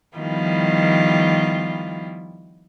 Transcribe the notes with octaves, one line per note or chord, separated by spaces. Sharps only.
D#3 F3 G3 B3 E4 F4